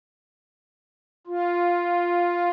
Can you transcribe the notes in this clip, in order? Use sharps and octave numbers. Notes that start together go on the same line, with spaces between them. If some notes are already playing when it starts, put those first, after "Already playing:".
F4